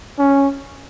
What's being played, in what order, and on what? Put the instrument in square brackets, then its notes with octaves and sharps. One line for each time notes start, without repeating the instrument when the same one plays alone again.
[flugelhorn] C#4